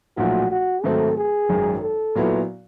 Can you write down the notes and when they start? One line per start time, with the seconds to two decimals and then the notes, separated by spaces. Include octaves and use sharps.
0.17 B1 A#2 F3 A3 F#4
0.51 F#4
0.83 G#2 D#3 F#3 A3 C4 A4
1.17 G#4
1.49 G#1 F#2 D#3
1.83 A4
2.15 A#2 F#3 B3 E4